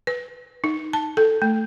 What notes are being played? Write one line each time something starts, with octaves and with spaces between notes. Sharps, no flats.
B4
D#4
A5
A4
A3